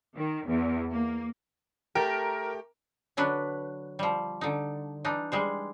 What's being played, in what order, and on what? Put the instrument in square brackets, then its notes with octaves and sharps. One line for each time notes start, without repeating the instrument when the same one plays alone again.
[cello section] D#3
E2
A#3
[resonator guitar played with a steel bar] A3 G4 [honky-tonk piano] A#4
[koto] D3 F#3 D4 B4
F3 G3
D3 D#4
E3 D4 D#4
G3 G#3 C5